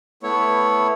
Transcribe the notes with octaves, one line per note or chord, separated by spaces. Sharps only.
A3 B3 E4 C#5